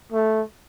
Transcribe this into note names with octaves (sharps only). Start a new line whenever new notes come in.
A3